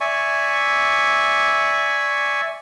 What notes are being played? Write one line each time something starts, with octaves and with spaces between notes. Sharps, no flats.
D5 E5 G#5 C#6